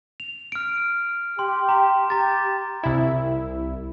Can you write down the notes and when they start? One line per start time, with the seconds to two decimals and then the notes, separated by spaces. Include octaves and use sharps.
0.20 F7
0.52 F6 D7
1.39 G4 C6
1.69 A#5 C6
2.10 G4 A#5 A6
2.83 C2 E4